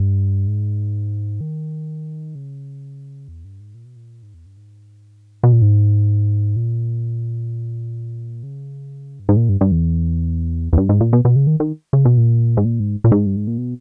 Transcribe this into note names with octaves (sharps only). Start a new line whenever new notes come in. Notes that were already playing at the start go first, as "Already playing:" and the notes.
Already playing: G2
G#2
D#3
C#3
E2
G2
G#2
A#2
B2
A#2
G#2
E2
G2
G#2
B2
A#2
G#2
A#2
C#3
G2
G#2
A#2
G2
G2
E2
E2
G2
G#2
A#2
B2
B2
C#3
D#3
D#3
C#3
B2
A#2
G#2
A#2
G#2
A#2
G#2
G2
G#2
A#2
B2